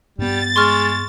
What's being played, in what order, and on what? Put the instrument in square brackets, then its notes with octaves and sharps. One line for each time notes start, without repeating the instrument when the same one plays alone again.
[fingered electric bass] G2 B3 [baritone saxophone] G3 [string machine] A6
[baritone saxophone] G#3 [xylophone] C6 C#6 F6